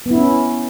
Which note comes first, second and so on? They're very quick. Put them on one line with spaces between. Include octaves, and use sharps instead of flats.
B3 E4 C#4